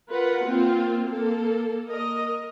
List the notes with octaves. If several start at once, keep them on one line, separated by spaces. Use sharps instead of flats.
F4 A#4 B4 F#5
A#3 C4 F4
A#3 A4
A#4 D#5